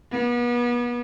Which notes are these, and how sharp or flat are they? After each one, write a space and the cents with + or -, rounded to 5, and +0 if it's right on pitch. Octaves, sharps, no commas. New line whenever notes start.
B3 -35